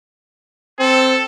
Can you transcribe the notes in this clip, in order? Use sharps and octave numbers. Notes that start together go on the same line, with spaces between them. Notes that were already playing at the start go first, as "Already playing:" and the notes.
C4 A4